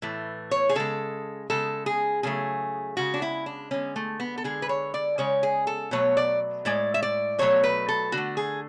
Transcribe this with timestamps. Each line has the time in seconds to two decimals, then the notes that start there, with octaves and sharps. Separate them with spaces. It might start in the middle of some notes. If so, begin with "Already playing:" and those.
0.02 A2 E3 A3
0.51 C#5
0.69 G#4
0.75 C#3 G#3 A4
1.50 C#3 G#3 A4
1.86 G#4
2.23 C#3 F#3 A3 G#4
2.97 C#3 G#3 F#4
3.14 D4
3.22 E4
3.46 D4
3.71 D3 G#3 C#4
3.96 A3
4.20 B3
4.38 A4
4.44 D3 G#3 G#4
4.62 B4
4.69 C#5
4.94 D5
5.18 C#3 G#3 C#5
5.43 G#4
5.67 A4
5.91 B2 F#3 A3 C#5
6.17 D5
6.65 A2 G#3 D5
6.94 E5
7.03 D5
7.39 B2 F#3 A3 C#5
7.64 B4
7.88 A4
8.12 D3 A3 F#4
8.37 G#4